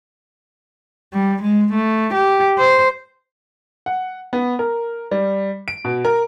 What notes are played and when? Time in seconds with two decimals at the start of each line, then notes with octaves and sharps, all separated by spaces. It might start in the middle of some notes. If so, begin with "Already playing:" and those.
1.13 G3
1.42 G#3
1.72 A3
2.13 G4
2.58 C5
3.86 F#5
4.33 B3
4.59 A#4
5.11 G3
5.68 D7
5.85 B2
6.05 A#4